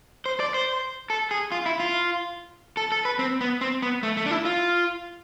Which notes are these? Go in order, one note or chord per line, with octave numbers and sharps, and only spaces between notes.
C5
D5
C5
A4
G#4
F4
E4
F4
A4
A4
B4
C4
B3
C4
B3
A3
A3
D4
E4
F4